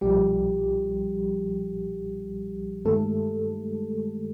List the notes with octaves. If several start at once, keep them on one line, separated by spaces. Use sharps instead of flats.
B1 A#2 F3 G3 G4
G2 D#3 G#3 A3 A4